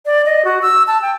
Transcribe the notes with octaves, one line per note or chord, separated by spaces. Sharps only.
D5
D#5
F#4
E6
A5
G5